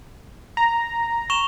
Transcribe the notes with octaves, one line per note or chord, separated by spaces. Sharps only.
A#5
C#6 E7 F7